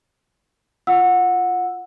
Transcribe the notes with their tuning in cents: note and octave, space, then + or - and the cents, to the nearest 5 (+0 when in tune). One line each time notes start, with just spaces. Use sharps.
F4 -10 F#5 -20 E6 +0